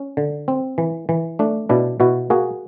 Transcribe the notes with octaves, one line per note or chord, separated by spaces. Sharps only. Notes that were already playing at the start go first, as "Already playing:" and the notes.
Already playing: C#4
D3
C4
E3
E3
A3 D4
B2 D4 E4
B2 E4 F#4
A#3 F#4 G#4